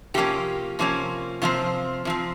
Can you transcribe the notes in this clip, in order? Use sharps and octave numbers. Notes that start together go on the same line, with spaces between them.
C3 F3 A#3 C#4 G4
C3 F3 A#3 C#4
C3 F3 C4 F4
C3 F3 C4